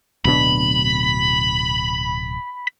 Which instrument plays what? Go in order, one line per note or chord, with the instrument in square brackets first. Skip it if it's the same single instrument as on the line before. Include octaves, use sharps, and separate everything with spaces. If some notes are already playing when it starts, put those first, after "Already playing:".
[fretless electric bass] D1 B2 D4 [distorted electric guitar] B5